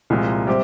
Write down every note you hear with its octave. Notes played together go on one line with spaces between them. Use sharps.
C2 A#2 F3 G#3
C3 G3 C4 G4